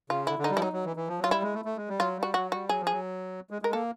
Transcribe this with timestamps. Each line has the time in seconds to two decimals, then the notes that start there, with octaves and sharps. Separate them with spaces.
0.10 C#3 F4
0.27 D3 E4
0.39 D3
0.44 D#4
0.50 G3
0.56 F3 E4
0.61 F#3 D#4
0.73 F#3
0.85 E3
0.96 E3
1.08 F3
1.19 F#3
1.24 F4
1.31 G3 E4
1.42 G#3
1.54 A3
1.65 A3
1.77 G#3
1.89 G3
1.99 F#3 F4
2.17 G3
2.23 F#4
2.34 F#3 F#4
2.51 G3 F#4
2.69 F#3 G#4
2.80 F3
2.87 G#4
2.92 F#3
3.50 G#3
3.62 G#3 A#4
3.73 A#3 A4